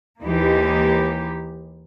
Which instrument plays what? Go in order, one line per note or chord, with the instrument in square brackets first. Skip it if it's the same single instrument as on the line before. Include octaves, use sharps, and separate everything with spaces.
[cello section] D#2 E3 G#3 A#3 D#4 G4